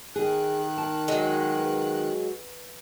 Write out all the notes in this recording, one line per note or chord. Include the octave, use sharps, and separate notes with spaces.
D#3 G#4 F#6
A5
F#3 G#3
B4